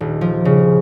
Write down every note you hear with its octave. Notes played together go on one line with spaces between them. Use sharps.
D#1
F3
C#3